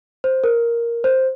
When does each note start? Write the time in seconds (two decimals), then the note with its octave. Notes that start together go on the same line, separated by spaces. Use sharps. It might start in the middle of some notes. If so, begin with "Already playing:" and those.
0.24 C5
0.44 A#4
1.04 C5